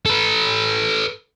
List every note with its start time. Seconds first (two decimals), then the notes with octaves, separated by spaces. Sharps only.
0.06 A4 B4